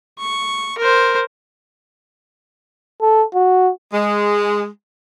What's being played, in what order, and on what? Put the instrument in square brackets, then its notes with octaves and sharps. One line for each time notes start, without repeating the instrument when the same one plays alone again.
[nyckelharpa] C#6
A#4 C5
[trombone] A4
F#4
[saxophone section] G#3